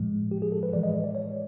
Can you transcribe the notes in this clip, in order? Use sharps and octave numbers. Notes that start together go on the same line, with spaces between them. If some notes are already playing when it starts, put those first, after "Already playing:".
Already playing: A2 F3 G#3
G4
G#4
A4
B4
A2 E3 G#3 D5
D#5
D5
D5
C#5